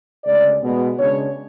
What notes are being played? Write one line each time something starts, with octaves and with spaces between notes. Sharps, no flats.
D2 C#3 G#3 D5
B2 G#3 B3
C#3 G#3 D4 C#5